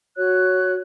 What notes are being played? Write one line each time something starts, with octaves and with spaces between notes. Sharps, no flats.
F#4 C#5 F#6